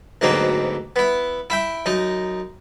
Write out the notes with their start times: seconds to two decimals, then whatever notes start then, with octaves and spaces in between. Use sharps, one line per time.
0.21 D2 G#2 B2 F#3 A#3 C4
0.96 B3 E4
1.50 E4 E5 G5
1.86 F#2 D#4